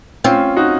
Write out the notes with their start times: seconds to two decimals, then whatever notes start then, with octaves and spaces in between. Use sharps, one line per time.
0.24 C4 C#4 F4
0.57 D#4 F#4